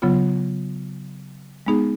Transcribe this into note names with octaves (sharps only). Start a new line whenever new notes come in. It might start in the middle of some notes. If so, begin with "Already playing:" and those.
C#3 F#3 B3 F4
G#3 B3 D#4 G#4